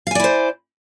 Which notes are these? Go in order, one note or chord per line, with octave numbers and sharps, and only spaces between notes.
E4 C5 D5 F5 G#5